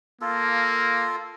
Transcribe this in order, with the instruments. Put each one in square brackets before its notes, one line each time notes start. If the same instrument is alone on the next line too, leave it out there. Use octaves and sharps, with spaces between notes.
[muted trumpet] A#3 [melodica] F4 A4